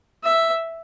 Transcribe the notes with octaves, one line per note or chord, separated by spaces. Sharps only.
E5